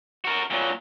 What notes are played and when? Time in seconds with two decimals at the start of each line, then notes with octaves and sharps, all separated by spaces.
0.25 F#4 A#4
0.50 A#2 F#3